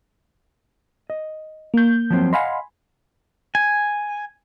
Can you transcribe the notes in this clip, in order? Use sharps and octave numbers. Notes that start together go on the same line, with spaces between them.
D#5
A#3 G6
F3 F#3 C4
D#5 F5 F#5 G#5 B5 C6
G#5